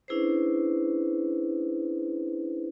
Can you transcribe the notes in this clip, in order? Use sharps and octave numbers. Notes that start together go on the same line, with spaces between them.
C#4 D4 E4 G#4 B4 C5